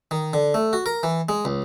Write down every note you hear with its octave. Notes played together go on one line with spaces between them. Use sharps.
D#3
D3
A3
F#4
A#4
E3
G#3
C#2